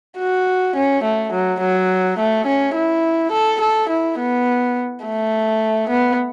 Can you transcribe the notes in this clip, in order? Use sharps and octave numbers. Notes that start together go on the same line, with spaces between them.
F#4
C#4
A3
F#3
F#3
A3
C#4
E4
A4
A4
E4
B3
A3
B3